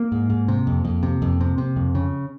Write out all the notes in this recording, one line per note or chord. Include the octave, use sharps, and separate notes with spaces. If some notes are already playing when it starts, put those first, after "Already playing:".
Already playing: A#3
G#2
G#2
C3
F2
F2
C3
F2
C3
C3
F2
C#3